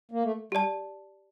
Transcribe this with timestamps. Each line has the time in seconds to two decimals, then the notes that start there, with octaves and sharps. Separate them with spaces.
0.11 A#3
0.23 A3
0.52 G3 G4 D5 A5